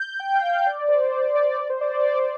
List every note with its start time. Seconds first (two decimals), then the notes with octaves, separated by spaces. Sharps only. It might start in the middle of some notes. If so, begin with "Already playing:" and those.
Already playing: G6
0.20 G5
0.35 F5
0.50 G5
0.66 D5
0.89 C5
1.11 D5
1.35 D5
1.57 D5
1.70 C5
1.81 D5
1.92 C5
2.03 D5
2.19 D5